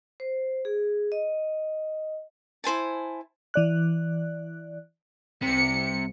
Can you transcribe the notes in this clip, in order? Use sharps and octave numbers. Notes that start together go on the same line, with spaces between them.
C5
G#4
D#5
E4 C5 G#5 A5
E3 D5 F#6
C2 C3 C#7